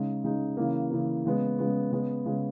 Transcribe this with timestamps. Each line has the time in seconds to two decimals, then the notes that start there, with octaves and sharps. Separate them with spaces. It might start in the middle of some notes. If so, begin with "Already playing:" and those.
Already playing: C#3 G#3 D#4
0.24 C#3 G#3 D#4
0.57 C#3 E3 A#3
0.90 C#3 E3 A#3
1.25 C#3 G#3 B3
1.59 C#3 G#3 B3
1.92 C#3 G#3 B3
2.26 C#3 G#3 B3